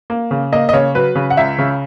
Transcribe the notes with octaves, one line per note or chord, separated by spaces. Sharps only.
A#3
C#3
A#3 D#5
D#5
C#3 C#5
F#3 B4
C#3
F#5
C#2 E5
C#3